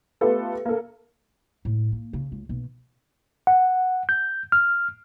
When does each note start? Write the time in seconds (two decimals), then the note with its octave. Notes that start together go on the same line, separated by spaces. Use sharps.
0.21 A3 B3 F4 G4 A4 B4
0.66 A#3 A4
1.65 A2
1.92 A#3
2.13 C#3
2.32 C#2
2.49 B1
3.47 F#5
4.09 G6
4.52 F6